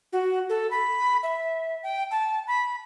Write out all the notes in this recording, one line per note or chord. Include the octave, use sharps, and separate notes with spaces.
F#4
A4
B5
E5
G5
A5
B5